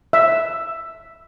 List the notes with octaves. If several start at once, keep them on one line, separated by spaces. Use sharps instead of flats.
E5